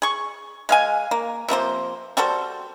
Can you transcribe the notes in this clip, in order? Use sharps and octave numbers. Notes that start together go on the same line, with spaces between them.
G#4 C#6
G#3 F5 G#5
A#3
C3 F3 A#3 C5
G3 F#4 A4 C5